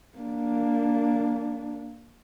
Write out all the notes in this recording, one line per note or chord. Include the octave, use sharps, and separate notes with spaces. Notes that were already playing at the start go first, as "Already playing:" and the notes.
A#3 D4